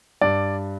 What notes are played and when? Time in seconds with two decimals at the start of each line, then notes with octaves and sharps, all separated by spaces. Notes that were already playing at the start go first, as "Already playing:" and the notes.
0.21 G2 D5